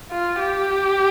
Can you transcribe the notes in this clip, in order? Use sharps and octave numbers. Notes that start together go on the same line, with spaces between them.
F4
G4